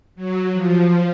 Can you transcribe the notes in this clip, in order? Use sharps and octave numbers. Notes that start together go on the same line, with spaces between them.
F#3
F3